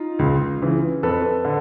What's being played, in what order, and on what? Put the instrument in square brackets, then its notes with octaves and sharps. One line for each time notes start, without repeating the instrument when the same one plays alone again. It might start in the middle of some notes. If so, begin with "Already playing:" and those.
Already playing: [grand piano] D#4 F4
C#2
C#3 E3
F2 A4 B4
D3